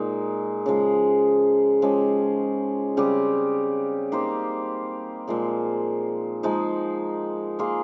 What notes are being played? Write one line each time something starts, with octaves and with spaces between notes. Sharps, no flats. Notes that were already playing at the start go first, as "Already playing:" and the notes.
Already playing: A#2 G#3 D#4
C#3 F3 G#3
F3 G#3 C#4 G4
C#3 G3 C4 G4
A#3 D#4 G4 C5
A#2 F3 G#3
F3 G#3 D#4
A#3 F4 G#4